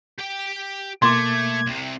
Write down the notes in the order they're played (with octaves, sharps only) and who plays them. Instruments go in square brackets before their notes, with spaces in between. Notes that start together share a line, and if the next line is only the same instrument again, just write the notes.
[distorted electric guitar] G4 G5
[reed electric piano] B2 A#3 D6 [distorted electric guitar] A3 [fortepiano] C6 [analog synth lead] G#6
[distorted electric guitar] C2 C3